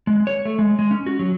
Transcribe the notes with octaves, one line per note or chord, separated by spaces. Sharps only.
G#3
C#5
A3
G#3
G#3
C#4
F#4
F#3